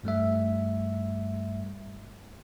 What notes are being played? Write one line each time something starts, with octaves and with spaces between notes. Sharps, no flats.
G2 G3 A3 E5